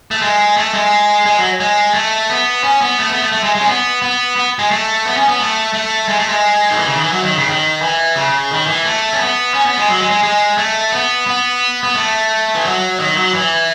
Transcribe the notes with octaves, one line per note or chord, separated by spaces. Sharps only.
A3
G#3
A3
G#3
G#3
F#3
G#3
A3
B3
C#4
B3
A3
B3
A3
A3
G#3
G#3
C#4
B3
B3
B3
G#3
A3
B3
C#4
B3
A3
A3
G#3
A3
G#3
D#3
E3
C#3
D#3
E3
F#3
D#3
C#3
D#3
E3
C#3
D#3
E3
A3
C#4
B3
C#4
B3
G#3
F#3
G#3
G#3
G#3
A3
B3
B3
B3
A3
E3
F#3
D#3
F#3
E3